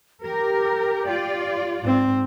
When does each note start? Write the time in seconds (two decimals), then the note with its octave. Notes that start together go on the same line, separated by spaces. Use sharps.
0.23 G4 A#4
1.07 F4 D5
1.80 G#2 C4